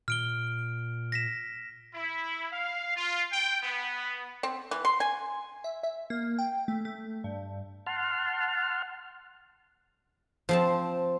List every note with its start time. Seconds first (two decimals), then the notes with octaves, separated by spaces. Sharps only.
0.08 A#2 F6 D7 G7
1.12 A#6 B6 E7
1.95 E4
2.52 F5
2.96 F4
3.32 G5
3.62 B3
4.43 C4
4.71 E3
4.85 C6
5.00 G#5
5.64 E5
5.83 E5
6.10 A#3
6.39 G5
6.68 A3
6.85 A3
7.24 G2
7.86 F#5 A5 C6 F6
10.49 F3 C4 A5